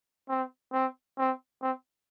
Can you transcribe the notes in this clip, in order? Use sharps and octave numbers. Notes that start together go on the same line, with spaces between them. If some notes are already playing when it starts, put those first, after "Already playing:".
C4
C4
C4
C4